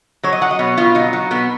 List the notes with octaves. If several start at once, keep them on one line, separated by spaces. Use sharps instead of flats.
F#3 C#5
D#5
F#3 F#5
D#5
B2 C#5
B2 F4
F#3 D#4
F#3
B2 B3